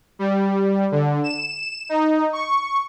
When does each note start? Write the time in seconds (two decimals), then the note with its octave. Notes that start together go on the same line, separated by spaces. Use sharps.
0.19 G3
0.92 D3
1.24 E7
1.89 D#4
2.33 C#6